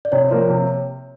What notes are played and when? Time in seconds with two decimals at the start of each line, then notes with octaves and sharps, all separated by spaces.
0.05 D5
0.12 C3 C#5
0.31 F3 A#3
0.50 C3